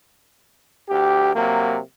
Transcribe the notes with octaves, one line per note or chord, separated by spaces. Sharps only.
D2 G4
C3 F#3 A#3